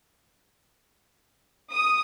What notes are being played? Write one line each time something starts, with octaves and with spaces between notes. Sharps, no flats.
D#6